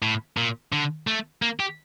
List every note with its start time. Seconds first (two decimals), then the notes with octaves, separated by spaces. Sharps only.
0.02 A2
0.37 A#2
0.72 D3
1.07 A3
1.42 A#3
1.60 G4